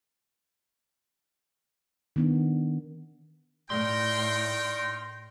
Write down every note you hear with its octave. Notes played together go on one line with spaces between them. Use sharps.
D#3 B3 D4
A2 D#4 A#4 D5 G5 C6